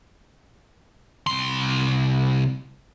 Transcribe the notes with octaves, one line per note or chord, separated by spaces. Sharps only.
C2 C6